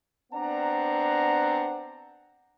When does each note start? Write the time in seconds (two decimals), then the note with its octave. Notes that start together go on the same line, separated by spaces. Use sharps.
0.33 B3 C4 D4 D5 F#5 A#5